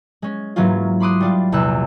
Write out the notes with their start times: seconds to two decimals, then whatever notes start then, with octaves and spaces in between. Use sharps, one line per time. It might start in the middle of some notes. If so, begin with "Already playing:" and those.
0.22 G#3 C#4
0.56 G#2 E3 F#3 A#3 C#4 F4
1.00 B5 C6 D6 D#6 F#6
1.20 G3 D4 F4
1.52 A#1 E2 C3 E6 F#6